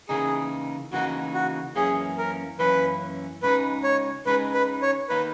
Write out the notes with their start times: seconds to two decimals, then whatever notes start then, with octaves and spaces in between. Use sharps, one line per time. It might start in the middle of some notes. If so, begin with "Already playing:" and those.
0.09 C#3 E3 A#3 D#4 G#4
0.92 C#3 E3 A#3 D#4 F#4
1.34 F#4
1.76 F#2 E3 A#3 C#4 G#4
2.18 A#4
2.59 F#2 E3 A#3 C#4 B4
3.43 C#2 C#3 G#3 D#4 B4
3.84 C#5
4.26 C#2 C#3 G#3 D#4 B4
4.55 B4
4.82 C#5
5.09 D#3 A#3 D#4 B4